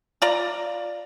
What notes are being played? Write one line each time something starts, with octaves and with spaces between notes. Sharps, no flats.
F4 D5 A#5